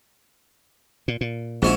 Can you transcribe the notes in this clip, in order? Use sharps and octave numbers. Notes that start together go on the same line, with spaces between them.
A#2
A#2
A#1 G#2 C#4 E4